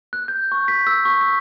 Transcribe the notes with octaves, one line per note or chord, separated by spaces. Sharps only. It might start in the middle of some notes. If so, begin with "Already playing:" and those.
F#6
G6
C#6
B6
E6
C#6
B6